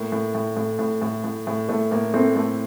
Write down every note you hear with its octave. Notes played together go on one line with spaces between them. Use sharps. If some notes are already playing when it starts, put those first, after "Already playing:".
Already playing: A2 A#3
A2
A2
A2
A2
A2
A2
A2
A2 A3
A2 A#3
A2 A3 C4
A2 A3